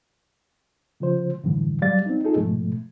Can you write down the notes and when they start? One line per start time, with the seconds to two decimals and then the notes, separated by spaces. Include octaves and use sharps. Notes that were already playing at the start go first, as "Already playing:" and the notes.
1.00 C#3 F3 F4 C5
1.44 F#2 A2 D3 E3 G3
1.82 F#3 G3 D5 F5 A6
2.06 C4 D#4
2.25 D#4 F4 G#4 A4
2.36 G#2 B2 F3 A3